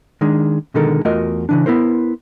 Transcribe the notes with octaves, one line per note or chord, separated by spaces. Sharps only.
D#3 G#3 D4
B2 D3 D#3 G#3 A4 A#4
E2 A3 F4 F#4 A#4 D#5
C#3 E3 D4
B3 E4 A#4 C5